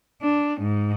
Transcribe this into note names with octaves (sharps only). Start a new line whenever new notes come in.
D4
G#2